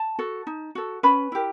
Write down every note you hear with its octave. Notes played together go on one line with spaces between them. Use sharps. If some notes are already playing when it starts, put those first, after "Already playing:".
Already playing: A5
F#4 A4
D#4
F#4 A4
C#4 B4 B5
E4 G4 A#4